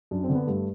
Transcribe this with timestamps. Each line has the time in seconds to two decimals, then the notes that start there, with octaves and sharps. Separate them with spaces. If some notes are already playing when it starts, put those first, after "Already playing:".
0.11 F#2 D4
0.23 C4
0.29 D3
0.35 B3
0.47 G2 A3